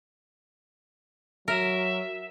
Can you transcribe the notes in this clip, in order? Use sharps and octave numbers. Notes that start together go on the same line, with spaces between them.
F#3 A#4 E5